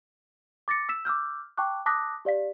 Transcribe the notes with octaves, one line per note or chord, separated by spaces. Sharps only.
D6 A6 A#6 C#7
E6 B6 E7
D6 E6 F6 G6
G5 A5 C#6 D6 F#6
A5 D6 D#6 F#6 A#6 B6
G4 D5 F5 B6